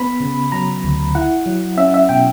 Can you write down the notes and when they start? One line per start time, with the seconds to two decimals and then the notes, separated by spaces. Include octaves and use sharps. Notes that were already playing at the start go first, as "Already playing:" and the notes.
Already playing: B3 B5
0.20 C#3
0.52 F#3 A#5
0.84 D2
1.15 E4 F#5
1.46 F#3
1.77 C#4 E5
1.94 E5
2.09 B2 G5